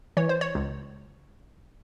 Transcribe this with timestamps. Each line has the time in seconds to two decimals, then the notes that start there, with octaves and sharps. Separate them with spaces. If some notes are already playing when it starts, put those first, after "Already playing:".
0.17 E3 C#5
0.29 C5
0.41 C#5
0.55 C#2